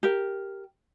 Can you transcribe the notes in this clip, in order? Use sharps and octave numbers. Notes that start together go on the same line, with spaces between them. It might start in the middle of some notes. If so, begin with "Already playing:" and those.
G4 A#4